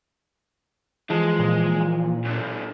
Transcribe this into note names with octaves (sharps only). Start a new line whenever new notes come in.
E3 F3 G#3 A5
A#2
F#2 D3